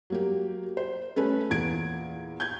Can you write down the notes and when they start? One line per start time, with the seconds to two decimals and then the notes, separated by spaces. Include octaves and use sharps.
0.10 F#3 A#3 G4
0.77 C5
1.16 A3 C#4 A4 B4
1.50 E2 A#2 G#6 D7
2.40 G6 G#6